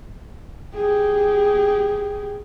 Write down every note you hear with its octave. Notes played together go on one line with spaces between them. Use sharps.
G4 G#4